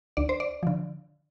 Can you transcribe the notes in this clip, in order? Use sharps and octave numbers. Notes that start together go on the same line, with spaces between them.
D2 D5
C5
D5
D3 F3